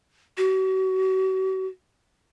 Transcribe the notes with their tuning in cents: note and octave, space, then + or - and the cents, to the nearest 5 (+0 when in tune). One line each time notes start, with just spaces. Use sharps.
F#4 +40